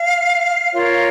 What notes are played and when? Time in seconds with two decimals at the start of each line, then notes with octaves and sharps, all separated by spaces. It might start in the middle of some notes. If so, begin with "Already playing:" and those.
Already playing: F5
0.72 F4 A#4 C#5 F5